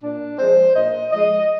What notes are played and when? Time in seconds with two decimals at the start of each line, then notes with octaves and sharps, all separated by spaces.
0.03 A#2 D4
0.39 F3 G#3 C5
0.75 A#2 D#5
1.12 F3 G#3 D#5